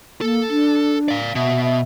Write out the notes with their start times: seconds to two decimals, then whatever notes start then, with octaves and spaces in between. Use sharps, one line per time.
0.21 A#3 A4
0.49 D4
1.08 D5 F5
1.35 B2 E5
1.63 E5